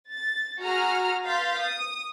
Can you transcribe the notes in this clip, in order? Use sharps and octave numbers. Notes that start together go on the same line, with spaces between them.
A6
F#4 G#4 A#5 F6
B4 F5 C6 G6 A6 B6
D#6